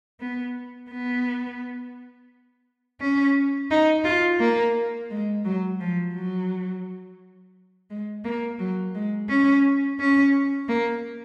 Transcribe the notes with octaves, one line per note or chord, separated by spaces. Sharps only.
B3
B3
C#4
D#4
F4
A#3
G#3
F#3
F3
F#3
G#3
A#3
F#3
G#3
C#4
C#4
A#3